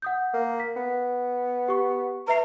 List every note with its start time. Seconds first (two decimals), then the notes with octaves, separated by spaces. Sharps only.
0.02 F#5 D#6 G6
0.33 A#3
0.60 B6
0.76 B3
1.68 G4 C#6
2.28 B4 E5 A#5 C7